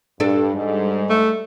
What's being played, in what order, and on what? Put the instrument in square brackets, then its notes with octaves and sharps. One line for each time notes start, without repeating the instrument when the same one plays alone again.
[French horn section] G2 [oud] D4 A4
[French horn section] G#2 [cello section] G3
[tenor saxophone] A3